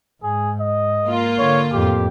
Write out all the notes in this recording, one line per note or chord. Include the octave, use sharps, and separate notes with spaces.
G#2 G#4
D#5
A#3 F4
D3 C#5
F2 A2 G4